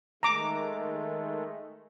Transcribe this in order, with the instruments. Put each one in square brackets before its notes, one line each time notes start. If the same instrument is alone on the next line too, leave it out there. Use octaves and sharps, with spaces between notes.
[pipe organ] D#3 G#3 A3 [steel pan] A#5 D6